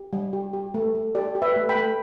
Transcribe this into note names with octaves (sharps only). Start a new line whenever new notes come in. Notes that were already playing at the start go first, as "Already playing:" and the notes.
Already playing: G4
G3
G4
G4
A3
A3
G4 A4 D5
G4
B4 E5
A3
G5 B5
A3